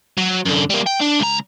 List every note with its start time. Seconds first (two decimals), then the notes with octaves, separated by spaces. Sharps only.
0.17 F#3
0.46 F#2 D3
0.70 G3 A#3
0.86 G5
1.00 D4
1.19 C#2 A#5